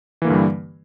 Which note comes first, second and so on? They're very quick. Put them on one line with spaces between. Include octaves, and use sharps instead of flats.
E3 A#3 D3 G2 G3